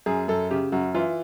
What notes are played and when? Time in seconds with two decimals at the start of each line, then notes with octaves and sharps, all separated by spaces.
0.06 F#2 G#4
0.28 F#2 A4
0.51 C#3 G4
0.72 F#2 F#4
0.94 E3 F4